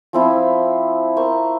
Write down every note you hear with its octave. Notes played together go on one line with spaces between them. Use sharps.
F3 C4 E4
A#4 C5 A#5 C#6